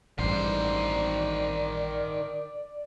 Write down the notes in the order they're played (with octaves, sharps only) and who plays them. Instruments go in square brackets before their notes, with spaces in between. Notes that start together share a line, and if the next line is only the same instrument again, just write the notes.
[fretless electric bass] A1 G2 [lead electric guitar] D#3 C5 [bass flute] D5